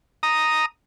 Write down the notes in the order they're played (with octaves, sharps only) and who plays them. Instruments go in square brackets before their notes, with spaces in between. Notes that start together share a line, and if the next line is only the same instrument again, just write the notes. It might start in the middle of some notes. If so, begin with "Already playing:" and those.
[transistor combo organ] A#5 D#6